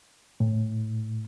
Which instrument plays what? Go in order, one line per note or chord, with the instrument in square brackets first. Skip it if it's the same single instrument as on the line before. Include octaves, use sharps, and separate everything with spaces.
[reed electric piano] A2